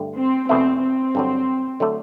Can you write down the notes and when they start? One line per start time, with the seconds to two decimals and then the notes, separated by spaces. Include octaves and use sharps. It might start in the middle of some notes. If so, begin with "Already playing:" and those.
Already playing: G2 D3 A3
0.17 C4
0.49 E2 B2 A3 C4 E4
0.82 C4
1.15 G2 D3 F#3
1.80 D3 F#3 A3